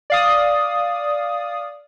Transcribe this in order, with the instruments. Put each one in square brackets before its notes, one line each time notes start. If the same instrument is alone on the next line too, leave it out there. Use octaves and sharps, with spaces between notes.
[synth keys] D5 F5 D#6